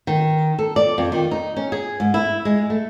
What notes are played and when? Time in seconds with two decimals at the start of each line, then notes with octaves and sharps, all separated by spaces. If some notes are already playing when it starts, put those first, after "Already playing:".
0.07 D#3
0.59 A4
0.76 D5
0.98 F2
1.12 D#3
1.31 D#4
1.57 C#4
1.72 G#4
2.00 G#2
2.14 E4
2.45 G#3
2.70 A3